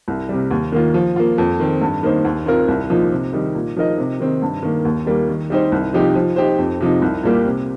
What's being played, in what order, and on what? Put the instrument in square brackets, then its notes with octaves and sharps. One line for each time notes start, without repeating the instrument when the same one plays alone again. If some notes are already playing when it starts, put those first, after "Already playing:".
[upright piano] C2
C3 G3
D#2
D#3 A#3 F4
F3
A#3 F4
F2
D#3 C4
G2
D#3 A#3 D#4 C5
D#2
D#3 C4 F4 A#4
C2
A#2 F3 D#4
C3
D#3 G3 D#4
A#2
F3 D#4 A#4 D#5
C3
D#3 C4 D#4
G2
D#3 A#3
D#2
D#3 G3 A#3
D#3
G3 D#4 G4 C5
C2
C3 F3 D#4 G4
F3
D#4 G4 C5
F2
C3 F3 D#4
C2
A#2 G3 A#3 G4
C3